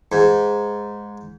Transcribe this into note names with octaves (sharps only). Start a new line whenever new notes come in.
G#2